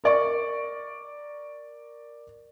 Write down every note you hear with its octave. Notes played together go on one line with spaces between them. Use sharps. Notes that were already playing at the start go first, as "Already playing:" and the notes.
A#4 D5 C#6